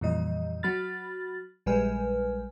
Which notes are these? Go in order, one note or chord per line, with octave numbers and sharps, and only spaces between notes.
F2 A#2 E3 G3 D#5
F#3 F#4 B5 F6 A6
A#1 G3 G#3 B4 G#5 F6